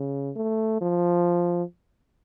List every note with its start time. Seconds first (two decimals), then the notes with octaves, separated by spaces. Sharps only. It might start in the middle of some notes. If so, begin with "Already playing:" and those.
Already playing: C#3
0.36 A3
0.81 F3